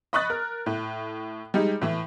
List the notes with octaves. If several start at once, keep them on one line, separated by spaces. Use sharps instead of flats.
D#5 B5 C#6 D#6 F#6 A6
A#4
A2
G3 G#3 D#4
A2 E3